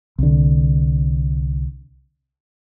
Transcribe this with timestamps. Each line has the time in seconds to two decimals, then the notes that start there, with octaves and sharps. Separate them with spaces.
0.18 C2 D3